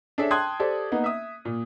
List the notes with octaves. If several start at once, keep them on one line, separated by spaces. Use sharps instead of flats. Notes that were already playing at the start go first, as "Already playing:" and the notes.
D4 G#4 A4 C#5 E5
G5 A5 C6 D#6 F#6 G#6
G4 A4 C5 D5
A#3 B3 D#4
E5 D#6
A#2